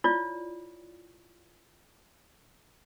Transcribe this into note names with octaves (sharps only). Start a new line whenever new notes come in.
E4 F4 C#5 D5